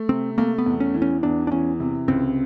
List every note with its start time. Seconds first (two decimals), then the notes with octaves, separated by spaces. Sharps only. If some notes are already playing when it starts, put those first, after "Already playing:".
Already playing: A3
0.09 C3 C4
0.38 A3 A#3
0.58 B3
0.66 E2
0.80 C#4
0.94 E3
1.02 C#4
1.23 E2 D4
1.47 D4
1.51 E3 C#4
1.80 C3
2.08 C#2 C4